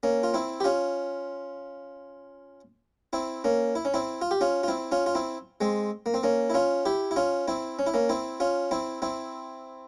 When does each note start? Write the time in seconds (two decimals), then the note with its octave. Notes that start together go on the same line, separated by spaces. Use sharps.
0.03 A#3 C#4
0.23 F4
0.34 C4 E4
0.60 G4
0.64 C#4 F4
3.13 C4 E4
3.44 A#3 C#4
3.75 E4
3.85 C#4
3.94 C4 E4
4.21 F4
4.31 G4
4.41 C#4 F4
4.63 F4
4.68 C4 E4
4.92 C#4 F4
5.06 F4
5.15 C4 E4
5.61 G#3 C4
6.06 A#3
6.14 C4
6.23 A#3 C#4
6.50 E4
6.54 C#4 F4
6.86 E4 G4
7.11 E4
7.16 C#4 F4
7.48 C4 E4
7.79 C#4
7.87 E4
7.94 A#3 C#4
8.09 C4 E4
8.40 C#4 F4
8.71 C4 E4
9.02 C4 E4